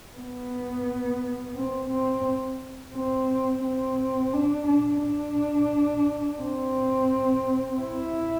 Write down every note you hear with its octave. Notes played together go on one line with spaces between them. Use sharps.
B3
C4
C4
C4
C4
D4
D4
D4
C4
E4